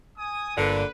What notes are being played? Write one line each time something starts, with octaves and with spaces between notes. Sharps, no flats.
G#5 D#6
G1 A#2 D3 B4